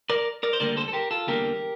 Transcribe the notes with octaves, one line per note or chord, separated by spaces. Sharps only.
A#4 D5
A#4 D5
C5
D2 D3 G3 A#3 A#4 D5
A4 C5
A4
G4 A#4
F4 A4
E2 D3 G3 A#3 G4 A#4